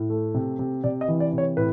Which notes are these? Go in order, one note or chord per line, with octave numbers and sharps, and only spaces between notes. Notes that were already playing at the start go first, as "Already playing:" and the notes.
Already playing: A2
A3
C3
C3
C3 D5
D#5
E3
D5
C3
C#5
A2 B4